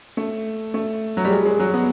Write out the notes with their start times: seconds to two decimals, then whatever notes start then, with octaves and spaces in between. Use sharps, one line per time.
0.17 A3
0.74 A3
1.17 F#3
1.24 G3
1.31 G#3
1.46 G#3
1.60 F#3
1.74 B3